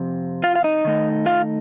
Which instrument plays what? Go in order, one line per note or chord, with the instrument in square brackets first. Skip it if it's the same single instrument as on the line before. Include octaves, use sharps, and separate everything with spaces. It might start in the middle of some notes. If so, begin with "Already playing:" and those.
Already playing: [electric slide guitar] F2 C3
F4 F5
F5
D#4 D#5
D#3 A3 D#4
F4 F5